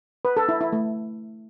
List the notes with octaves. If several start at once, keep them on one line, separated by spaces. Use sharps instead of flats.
B4
A4
E4
E4
A3